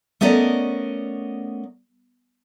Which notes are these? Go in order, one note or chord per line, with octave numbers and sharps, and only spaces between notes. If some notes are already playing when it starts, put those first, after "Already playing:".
A3 B3 C#4 A#4 D5 D#5